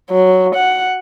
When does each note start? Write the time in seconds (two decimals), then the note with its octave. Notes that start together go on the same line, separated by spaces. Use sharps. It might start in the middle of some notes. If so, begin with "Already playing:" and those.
0.11 F#3
0.55 F#5